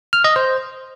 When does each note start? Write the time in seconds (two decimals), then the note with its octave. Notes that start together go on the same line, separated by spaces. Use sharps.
0.13 F6
0.24 D#5
0.36 C5